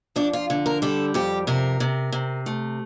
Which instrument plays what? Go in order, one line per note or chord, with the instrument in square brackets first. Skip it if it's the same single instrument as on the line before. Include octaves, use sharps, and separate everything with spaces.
[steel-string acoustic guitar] F2 D4
F4
D3
A#4
G3 A4
F2 G4
C3 A#4
C3
C3
A3